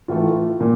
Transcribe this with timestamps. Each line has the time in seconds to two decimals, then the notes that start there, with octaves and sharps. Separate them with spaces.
0.08 A2 E3 A3 F4
0.60 A#2